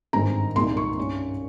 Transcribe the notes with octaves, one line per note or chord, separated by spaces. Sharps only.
G#1 G2 D#3 G#3 C4 A#5
C2 A#2 G#3 D#4 C6
C#6
G2 G3 C#4